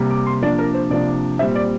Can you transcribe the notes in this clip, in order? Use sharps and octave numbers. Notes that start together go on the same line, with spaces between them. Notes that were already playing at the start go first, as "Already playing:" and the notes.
Already playing: C3 G3 A#3
D6
C6
C3 F3 A#3 D4 D5
A#4
C5
C3 F3 A#3 D4 D5
A#2 G3 C4 E5
D5